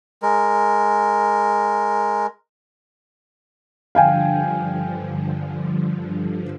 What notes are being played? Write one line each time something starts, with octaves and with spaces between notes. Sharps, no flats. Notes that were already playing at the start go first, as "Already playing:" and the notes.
G#3 A#4
G2 D3 F3 F5 G5 G#5